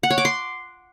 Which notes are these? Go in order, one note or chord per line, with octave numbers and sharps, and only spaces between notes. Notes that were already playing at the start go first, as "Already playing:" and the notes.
F#5
C#5
D6
C6